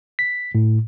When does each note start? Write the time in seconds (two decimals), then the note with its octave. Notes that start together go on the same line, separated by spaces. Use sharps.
0.19 B6
0.55 A2